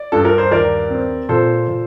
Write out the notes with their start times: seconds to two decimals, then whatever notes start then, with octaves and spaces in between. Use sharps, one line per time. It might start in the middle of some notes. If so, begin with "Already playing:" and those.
Already playing: D5
0.12 G2 A4
0.25 A#4
0.38 C5
0.51 D#2 A#4 D5
0.90 C4
1.29 A#2 A4 C5
1.68 A#2